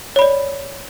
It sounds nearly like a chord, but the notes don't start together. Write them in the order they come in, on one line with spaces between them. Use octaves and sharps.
C#5 B5 D5